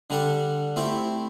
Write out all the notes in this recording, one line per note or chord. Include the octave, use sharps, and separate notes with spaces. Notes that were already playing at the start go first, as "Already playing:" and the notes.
D3 G3 D4 A4
A3 C4 E4 G4